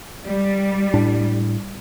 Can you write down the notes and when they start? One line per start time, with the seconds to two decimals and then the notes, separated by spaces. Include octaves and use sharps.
0.24 G3
0.94 A2 D4